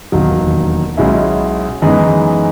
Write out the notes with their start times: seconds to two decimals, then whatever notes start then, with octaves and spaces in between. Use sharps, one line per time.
0.12 E1 D#2 D#3 F#3
0.97 B1 B2 G#3 C#4 E4
1.82 F#2 E3 G#3 B3 D#4